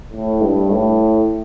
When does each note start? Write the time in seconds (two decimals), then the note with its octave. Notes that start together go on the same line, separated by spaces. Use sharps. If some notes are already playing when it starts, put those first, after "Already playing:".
0.13 A2
0.42 G2
0.70 A2